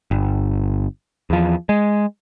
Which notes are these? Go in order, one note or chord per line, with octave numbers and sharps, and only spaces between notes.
G1
E2 F3
G#3